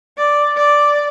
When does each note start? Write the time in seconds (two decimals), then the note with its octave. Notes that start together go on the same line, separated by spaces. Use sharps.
0.18 D5
0.56 D5